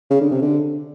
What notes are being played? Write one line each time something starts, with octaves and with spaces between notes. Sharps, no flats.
C#3
D3
C3
D3